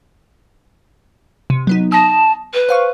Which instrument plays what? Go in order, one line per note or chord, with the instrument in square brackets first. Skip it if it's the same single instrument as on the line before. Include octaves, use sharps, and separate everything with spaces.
[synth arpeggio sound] C3
F#3 B3 D#4
[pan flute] A5 [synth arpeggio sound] D#6 A#6
[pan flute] B4
[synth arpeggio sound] C5 F5 C#6